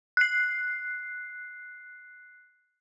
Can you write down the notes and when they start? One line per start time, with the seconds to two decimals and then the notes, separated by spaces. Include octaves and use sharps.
0.17 F#6 C7